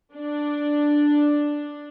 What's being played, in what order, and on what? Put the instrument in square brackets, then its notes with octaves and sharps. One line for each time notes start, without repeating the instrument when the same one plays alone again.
[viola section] D4